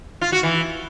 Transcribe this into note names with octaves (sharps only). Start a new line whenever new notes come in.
F4
F#4
E3